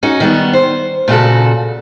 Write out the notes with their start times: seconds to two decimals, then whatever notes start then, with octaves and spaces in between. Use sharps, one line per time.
0.03 C#4 D#4 F#4
0.20 D#3 G3 B3
0.53 C5
1.08 A#2 C#3 F#4 A4